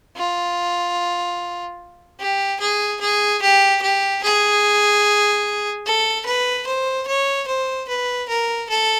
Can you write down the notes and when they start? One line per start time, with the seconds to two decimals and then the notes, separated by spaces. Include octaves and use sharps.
0.17 F4
2.20 G4
2.60 G#4
3.01 G#4
3.42 G4
3.82 G4
4.23 G#4
5.86 A4
6.26 B4
6.67 C5
7.08 C#5
7.48 C5
7.88 B4
8.29 A#4
8.70 A4